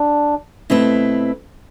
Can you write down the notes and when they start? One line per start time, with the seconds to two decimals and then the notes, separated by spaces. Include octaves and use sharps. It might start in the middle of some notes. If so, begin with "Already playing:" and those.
Already playing: D4
0.70 B2 A3 C4 E4 B4